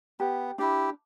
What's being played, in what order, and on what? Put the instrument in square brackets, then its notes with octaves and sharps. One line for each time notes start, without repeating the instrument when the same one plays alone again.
[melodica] B3 [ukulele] G4
[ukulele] D4 [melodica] E4 G4